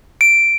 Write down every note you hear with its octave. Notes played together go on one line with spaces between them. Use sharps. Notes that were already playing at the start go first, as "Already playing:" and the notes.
D7